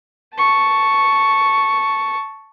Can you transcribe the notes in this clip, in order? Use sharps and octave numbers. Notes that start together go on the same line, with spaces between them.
A5 C#6